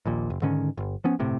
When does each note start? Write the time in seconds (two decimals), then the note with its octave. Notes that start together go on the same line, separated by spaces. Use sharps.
0.06 A#1 D#2 A#2
0.30 F#1
0.42 G#2 D3 D#3 C#4
0.77 G1
1.04 F3 B3 C#4
1.19 G1 A2 C3